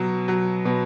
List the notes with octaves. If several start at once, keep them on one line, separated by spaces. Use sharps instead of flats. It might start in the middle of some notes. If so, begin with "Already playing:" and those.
Already playing: B2 F#3
F#3
B2